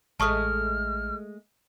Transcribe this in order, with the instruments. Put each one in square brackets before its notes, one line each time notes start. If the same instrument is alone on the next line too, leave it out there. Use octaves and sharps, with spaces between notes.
[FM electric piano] A1 [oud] G#3 A3 [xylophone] A5 C#6 D#6 [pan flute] F6